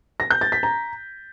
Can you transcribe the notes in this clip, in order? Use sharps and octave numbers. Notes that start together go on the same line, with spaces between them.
A#6
G6
A6
B6
A#5